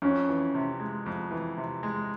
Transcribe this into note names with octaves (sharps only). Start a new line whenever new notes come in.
F2 C#4
E3
C3
G#3
F2
E3
C3
G#3